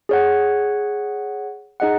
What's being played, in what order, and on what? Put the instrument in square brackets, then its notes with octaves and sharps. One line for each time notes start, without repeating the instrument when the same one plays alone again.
[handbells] G#4 C#5 F#5
D#4 G#4 D#5 F#5